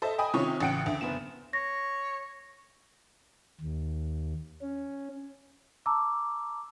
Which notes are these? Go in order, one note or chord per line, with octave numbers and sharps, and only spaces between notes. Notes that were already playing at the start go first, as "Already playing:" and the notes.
A4 C5 D#5 E5
D#5 G5 G#5 B5 D#6
C3 D#3 C#4 F4 C#5 C#6
A1 C#3 F#5 G5 D7
D2
F#1 B3 E7
C#5 A#6
D#2
C#4
A5 A#5 D6 E6